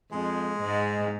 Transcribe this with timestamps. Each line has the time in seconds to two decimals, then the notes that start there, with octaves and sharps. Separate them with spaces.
0.12 F2 G#3
0.60 G#2